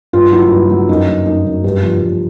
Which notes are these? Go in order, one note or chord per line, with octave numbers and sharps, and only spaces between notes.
G2 F4
F#3 E4
G2
F#3
F#2 D#4
F#3
F#2 D#4
F#2
G2 G4
F3
G2